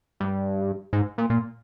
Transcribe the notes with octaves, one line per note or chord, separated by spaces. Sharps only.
G2
G#2
A#2
A#2